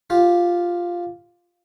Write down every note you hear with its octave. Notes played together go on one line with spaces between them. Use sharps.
F4 G4